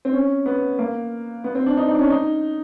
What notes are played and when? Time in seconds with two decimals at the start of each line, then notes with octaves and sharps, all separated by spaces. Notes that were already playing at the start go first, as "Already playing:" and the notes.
0.05 C4
0.13 C#4
0.46 B3
0.79 A#3
1.44 B3
1.55 C4
1.66 D4
1.77 D#4
1.89 D#4
1.94 D4
1.99 C#4
2.10 D#4